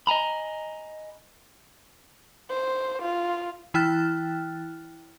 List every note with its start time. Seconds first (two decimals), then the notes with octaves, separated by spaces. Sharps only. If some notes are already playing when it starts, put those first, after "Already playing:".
0.07 D#5 G#5 A#5 B5
2.49 C5
3.02 F4
3.74 E3 E4 G5 F6 F#6 A6